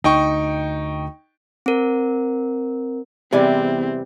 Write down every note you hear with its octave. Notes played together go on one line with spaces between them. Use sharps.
D2 D#4 G5 C#6
C4 A#4
E2 C3 E3 G3 C4 G#4 D5 G#5